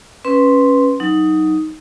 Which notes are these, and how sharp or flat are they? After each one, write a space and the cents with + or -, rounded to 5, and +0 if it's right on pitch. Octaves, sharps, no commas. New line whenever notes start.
C#4 -5 B4 +0 C6 +0
F#3 +0 D#4 +5